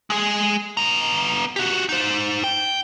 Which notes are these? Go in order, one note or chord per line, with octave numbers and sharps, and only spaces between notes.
G#3 G#4
B3 A#5
F#4 G4
D#4 C5
G5